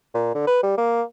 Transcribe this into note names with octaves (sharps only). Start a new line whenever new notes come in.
A#2
D3
B4
G3
A#3